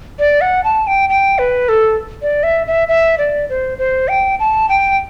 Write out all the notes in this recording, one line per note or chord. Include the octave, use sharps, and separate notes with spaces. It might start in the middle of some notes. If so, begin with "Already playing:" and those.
D5
F#5
A5
G5
G5
B4
A4
D5
E5
E5
E5
D5
C5
C5
G5
A5
G5